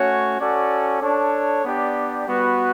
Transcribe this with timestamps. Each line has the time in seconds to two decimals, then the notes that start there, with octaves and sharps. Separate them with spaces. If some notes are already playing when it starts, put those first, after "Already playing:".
Already playing: A3 C#4 F#4 C#5
0.39 C#4 F#4 A4 D5
1.01 D4 A4 C#5
1.63 B3 D4 G4 D5
2.25 G3 B3 F#4 B4